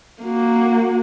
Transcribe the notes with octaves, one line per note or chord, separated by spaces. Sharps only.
A#3 F#4